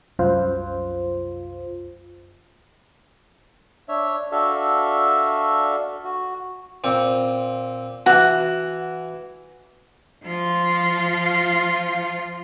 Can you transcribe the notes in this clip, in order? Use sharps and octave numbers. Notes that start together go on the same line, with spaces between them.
C2 F#2 F4 C5
D4 C#5 E5
D4 F#4 A4 E5 F5
F#4
A#2 C4
E3 F#4
F3 F4